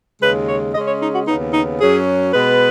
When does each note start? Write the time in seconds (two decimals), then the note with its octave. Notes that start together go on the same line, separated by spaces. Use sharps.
0.21 D#2 C#3 G#3 B4
0.47 C#5
0.74 C#3 G#3 C#4 D#5
0.87 C#5
1.00 D#4
1.14 F#4
1.26 D#2 C#3 B3 D#4
1.52 D#4
1.79 F#2 F#3 C#4 G#4
2.32 B2 G#3 B3 B4